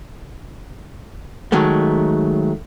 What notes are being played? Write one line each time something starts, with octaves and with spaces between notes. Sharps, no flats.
D#3 F#3 G#3 A3